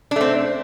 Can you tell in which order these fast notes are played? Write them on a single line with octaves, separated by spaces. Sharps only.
D4 A3 C4